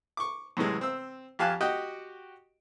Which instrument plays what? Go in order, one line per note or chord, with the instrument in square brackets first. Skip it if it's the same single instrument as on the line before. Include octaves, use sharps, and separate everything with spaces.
[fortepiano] C#6 D6
F#2 A2 C3 E3 G#3
C4 E6
F2 G4 F5 G#5 A5 F#6
F#4 G4 D#5 F#5 G5